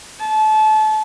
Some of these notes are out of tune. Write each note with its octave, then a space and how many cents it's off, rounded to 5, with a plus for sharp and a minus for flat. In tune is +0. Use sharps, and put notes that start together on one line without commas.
A5 -30